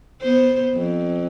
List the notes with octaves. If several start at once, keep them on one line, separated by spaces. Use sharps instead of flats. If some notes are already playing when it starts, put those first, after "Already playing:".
B3 C5
F2